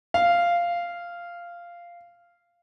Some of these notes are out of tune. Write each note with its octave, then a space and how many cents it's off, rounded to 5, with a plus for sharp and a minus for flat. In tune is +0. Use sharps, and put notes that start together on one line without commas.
F5 -10